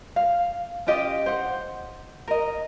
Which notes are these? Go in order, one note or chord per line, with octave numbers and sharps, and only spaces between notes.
F5
C#4 F4 G4 D#5
C5 F#5
A#4 D#5